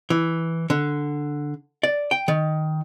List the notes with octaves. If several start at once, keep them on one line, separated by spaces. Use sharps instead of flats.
E3
D3
D5
G5
D#3